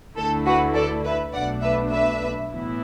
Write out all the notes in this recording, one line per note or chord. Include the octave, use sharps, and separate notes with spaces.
D2 D3 A3 E4 A4
F#4 B4
A4 D5
B4 E5
B1 B2 A3 D4 D5 F#5
B4 E5
B4 E5
A2 E3 B3 E4